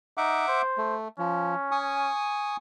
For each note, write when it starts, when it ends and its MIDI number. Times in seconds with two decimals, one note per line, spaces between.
0.17 0.43 63
0.17 0.62 76
0.17 0.62 78
0.17 0.62 86
0.48 0.95 72
0.78 1.08 57
1.19 1.55 53
1.19 2.09 61
1.72 2.57 80
1.72 2.57 85
1.72 2.57 87